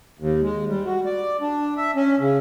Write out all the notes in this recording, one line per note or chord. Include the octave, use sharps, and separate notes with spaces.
D#2
G#3
G3
F#4
D5
D4
E5
C#4
C#3